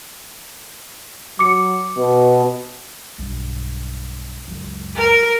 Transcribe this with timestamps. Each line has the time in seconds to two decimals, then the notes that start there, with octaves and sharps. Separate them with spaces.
1.39 F#3 D6 C#7
1.97 B2
3.18 B1 G2
4.48 C#2 F#2
4.96 A#4